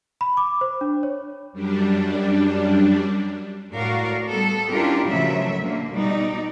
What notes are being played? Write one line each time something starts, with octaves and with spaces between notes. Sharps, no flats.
B5
D6
C5
D4
C#5
F#2 G3 D4
A2 F#4 A#4 D5 F5
G3 B3 A4
C#4 D4 E4 F4 G4 A#4
A#2 C#3 F3 F#3 A3 E5
D3 A#3
B2 G3 D#4 D5